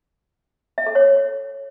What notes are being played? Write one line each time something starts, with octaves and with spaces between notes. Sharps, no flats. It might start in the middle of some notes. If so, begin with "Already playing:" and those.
E5
A4
C#5